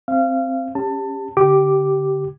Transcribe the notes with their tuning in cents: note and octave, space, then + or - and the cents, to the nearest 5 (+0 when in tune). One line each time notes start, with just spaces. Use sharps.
C4 +5 F5 -25
C#4 +0 G4 +25 A5 +20
D3 -40 G4 -15 D6 +0